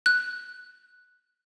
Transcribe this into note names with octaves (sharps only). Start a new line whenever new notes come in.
F#6